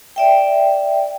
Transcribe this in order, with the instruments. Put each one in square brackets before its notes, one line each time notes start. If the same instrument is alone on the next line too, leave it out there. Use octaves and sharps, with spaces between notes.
[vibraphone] D5 E5 G5